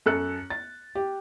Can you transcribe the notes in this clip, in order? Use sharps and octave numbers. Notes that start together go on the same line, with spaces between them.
F#2 A4 F#6 C#7
A6
G4